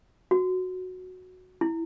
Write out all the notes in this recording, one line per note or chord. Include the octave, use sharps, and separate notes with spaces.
F#4
E4